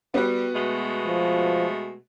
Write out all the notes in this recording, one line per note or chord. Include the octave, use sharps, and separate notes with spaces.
G3 B3 F#4
B2 G#3 A3
F3